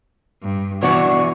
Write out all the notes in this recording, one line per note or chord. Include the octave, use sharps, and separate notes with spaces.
G2
B2 E3 D4 F#4 D5 C#6